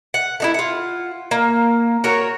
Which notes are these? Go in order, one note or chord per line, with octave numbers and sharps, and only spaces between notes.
F#5
A3 D#4 E4
F4 F#5
A#3
F#4 A#4 C#5